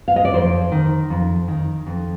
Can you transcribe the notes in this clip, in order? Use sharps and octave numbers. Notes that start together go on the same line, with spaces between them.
F5
D#5
D5
F2 C5
D#3
F2
D#3
F2